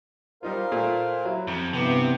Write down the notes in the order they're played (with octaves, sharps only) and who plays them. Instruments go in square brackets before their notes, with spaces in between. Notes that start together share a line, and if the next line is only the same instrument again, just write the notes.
[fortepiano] G3 D#4 F4 [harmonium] A#4 C5 F5
[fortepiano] A#2 A3
F#3 E4
[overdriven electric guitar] F2
[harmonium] G2 E3 B3 [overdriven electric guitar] C3